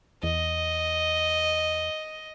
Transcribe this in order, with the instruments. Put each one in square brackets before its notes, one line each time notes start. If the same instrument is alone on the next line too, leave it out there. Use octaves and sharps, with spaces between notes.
[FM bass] E2 [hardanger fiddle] D#5